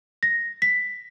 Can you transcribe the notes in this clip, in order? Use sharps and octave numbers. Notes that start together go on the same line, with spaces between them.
A#6
B6